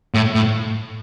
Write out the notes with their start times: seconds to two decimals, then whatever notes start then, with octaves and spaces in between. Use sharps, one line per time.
0.14 A2
0.35 A2